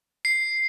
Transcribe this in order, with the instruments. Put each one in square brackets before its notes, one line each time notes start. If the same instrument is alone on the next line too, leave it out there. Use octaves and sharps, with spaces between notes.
[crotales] C7